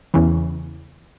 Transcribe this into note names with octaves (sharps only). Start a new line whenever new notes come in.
E2 C#3 E3